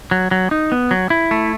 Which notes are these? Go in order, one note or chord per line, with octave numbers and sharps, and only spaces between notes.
F#3
F#3
D#4
B3
F#3
E4
A3